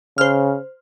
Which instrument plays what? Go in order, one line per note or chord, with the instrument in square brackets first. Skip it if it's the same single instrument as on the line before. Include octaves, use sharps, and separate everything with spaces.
[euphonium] C#3 [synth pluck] C5 F6